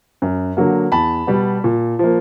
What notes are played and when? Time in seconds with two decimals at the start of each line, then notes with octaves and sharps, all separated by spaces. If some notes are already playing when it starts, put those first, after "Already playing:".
0.22 F#2
0.57 D3 F#3 A#3
0.92 E2 A5 B5
1.27 B2 G3 B3
1.64 A#2
1.99 F3 A#3